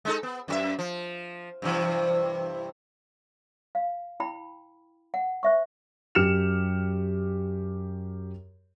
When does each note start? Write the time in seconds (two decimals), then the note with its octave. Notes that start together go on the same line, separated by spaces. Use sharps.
0.05 G#3 D#4 A4
0.23 B3
0.48 F#2 F#4 E5
0.79 F3
1.62 G2 C3 E3
3.75 F5
4.20 E4 G5 B5
5.14 F#5
5.43 C5 E5 C#6
6.15 F#2 G4 F6 C#7 E7 F7